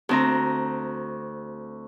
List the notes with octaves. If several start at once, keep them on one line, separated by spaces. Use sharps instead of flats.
D2 C4 A#5